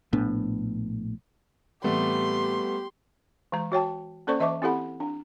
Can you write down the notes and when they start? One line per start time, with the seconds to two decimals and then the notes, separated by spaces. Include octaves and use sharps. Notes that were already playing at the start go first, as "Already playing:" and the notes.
0.13 A#1 A2 B3 D4
1.84 A2 E3 G3 A3 B3 C4 G4 C6
3.52 E3 G#3 A#5
3.72 F#4 C#5 G5 A5
4.27 A#3 C#4 A4 C5 D5 C#6
4.40 E3 D#5 E5 A5 C#6 D6
4.62 C4 E4 G4 A4 F#5 B5
5.00 D4